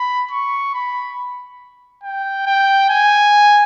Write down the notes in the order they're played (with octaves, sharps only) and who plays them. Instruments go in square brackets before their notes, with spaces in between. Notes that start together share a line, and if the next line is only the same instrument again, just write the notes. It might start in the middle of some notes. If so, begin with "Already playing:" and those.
Already playing: [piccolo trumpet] B5
C#6
B5
G5
G5
G#5